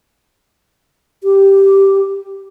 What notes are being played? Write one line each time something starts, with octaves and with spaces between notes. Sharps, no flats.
G4